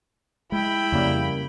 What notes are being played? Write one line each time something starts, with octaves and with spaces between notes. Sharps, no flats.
G#3 E4 G5 B5
F2 C#3 G3 A#3